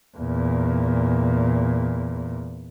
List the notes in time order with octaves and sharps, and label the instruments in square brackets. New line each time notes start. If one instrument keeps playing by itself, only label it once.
[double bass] E2 A#2